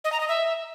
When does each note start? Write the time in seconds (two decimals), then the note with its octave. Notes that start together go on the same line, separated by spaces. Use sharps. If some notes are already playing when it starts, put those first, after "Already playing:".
0.04 D#5
0.12 A#5
0.20 D#5
0.28 E5